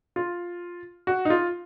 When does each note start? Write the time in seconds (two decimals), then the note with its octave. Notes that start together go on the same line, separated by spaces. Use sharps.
0.16 F4
1.07 F#4
1.25 D#4
1.30 F4